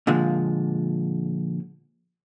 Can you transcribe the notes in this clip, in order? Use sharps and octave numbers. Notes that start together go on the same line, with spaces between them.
A#2 D3 F3 G#3